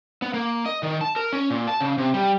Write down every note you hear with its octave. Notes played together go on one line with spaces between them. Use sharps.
B3
A#3
D#5
D#3
A5
A#4
C#4
A#2
A5
C#3
C3
G3